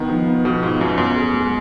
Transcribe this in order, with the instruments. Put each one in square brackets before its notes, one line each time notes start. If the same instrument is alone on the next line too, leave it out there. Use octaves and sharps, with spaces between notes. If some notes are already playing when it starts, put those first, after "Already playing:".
Already playing: [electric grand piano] D#3 [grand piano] B3
[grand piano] F3
B3
[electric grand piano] B2 [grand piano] F3
[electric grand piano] G#2 [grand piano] F4
[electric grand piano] F#2 [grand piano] B3
[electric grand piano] F#2 [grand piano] B3
[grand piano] G#4
G#3